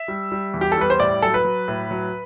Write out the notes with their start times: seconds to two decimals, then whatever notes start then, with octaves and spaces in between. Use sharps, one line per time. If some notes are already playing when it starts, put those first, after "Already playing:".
Already playing: E5
0.08 G3
0.32 G3
0.54 E2
0.61 G4
0.72 A4
0.77 G3 B4
0.90 C5
0.99 A2 D5
1.22 F#3 A4
1.34 B4
1.45 F#3
1.68 A2
1.91 F#3